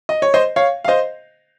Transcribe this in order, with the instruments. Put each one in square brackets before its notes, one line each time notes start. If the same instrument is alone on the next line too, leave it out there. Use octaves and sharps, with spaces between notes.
[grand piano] D#5
C#5
C5 D#5
C#5 F5
F5
C5 D#5